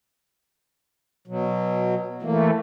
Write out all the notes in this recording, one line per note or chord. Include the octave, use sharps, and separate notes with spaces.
B2 F#3
E3 A3 A#3